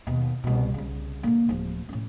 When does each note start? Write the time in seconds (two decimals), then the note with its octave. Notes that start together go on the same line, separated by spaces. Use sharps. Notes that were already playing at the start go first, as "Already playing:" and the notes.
0.07 D#2 B2
0.44 C2 B2
0.74 C2 C#3
1.23 D3 A#3
1.49 D1 F3
1.89 A2 C#4